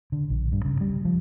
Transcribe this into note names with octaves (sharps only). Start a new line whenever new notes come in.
D3
A#1
G2
C#3
G3
F3